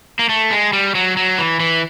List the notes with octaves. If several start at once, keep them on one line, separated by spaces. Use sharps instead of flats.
A#3
A3
G#3
G3
F#3
F#3
E3
E3